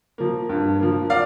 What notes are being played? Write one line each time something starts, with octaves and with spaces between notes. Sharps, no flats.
F3 A#3
G2
F3 A#3
D5 F5